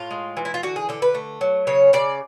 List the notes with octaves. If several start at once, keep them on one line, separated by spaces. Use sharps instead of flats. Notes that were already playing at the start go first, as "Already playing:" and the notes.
Already playing: A2 F4
G#3
E3
E4
F4
D3 F#4
G#4
D3 A4
B4
A3
F#3
C#3 C#5
C#3 D5